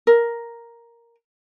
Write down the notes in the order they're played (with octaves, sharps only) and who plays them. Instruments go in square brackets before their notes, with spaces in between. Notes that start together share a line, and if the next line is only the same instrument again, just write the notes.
[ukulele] A#4